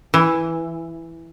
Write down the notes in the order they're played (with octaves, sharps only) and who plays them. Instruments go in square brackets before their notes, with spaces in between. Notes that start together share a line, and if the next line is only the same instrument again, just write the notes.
[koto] E3